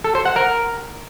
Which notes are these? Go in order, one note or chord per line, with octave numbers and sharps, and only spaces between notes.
A4
C5
F#5
A#4